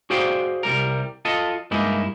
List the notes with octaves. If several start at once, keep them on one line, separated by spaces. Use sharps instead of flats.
F#4 G#4 C5 D5 F5 G5
C2 F2 G3 A#4
F4 A4 D#5
G2 G#3 A#3 D#4 E4